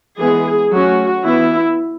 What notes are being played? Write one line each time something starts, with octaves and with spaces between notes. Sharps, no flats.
E3 G#3 B3 G#4
F#3 A3 C#4 F#4
E3 B3 E4